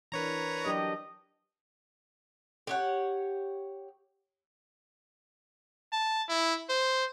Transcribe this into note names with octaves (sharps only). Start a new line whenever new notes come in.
E3 D4 A#4 B4 C#5 A#5
F#3 D4 G4 D#5
G4 C#5 F#5
A5
E4
C5